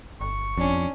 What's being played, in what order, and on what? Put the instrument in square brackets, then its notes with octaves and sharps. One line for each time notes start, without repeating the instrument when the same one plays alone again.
[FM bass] G1 [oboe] C#6
[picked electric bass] F2 [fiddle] C#4 D4